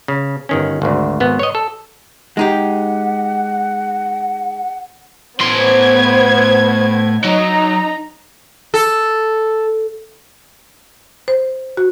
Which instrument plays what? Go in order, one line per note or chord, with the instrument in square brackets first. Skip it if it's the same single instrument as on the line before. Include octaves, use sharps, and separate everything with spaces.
[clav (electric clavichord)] C#3
G1 D#3 C#4
G#1 D2
G#1 B3
C#5 D#5
A4
[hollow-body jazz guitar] G#3 D#4 G4 [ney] F#5
[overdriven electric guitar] A2 C6 [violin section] B3 C5 G#6
[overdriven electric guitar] F#3 [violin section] D#4 A#5
[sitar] A4
[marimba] C5
F#4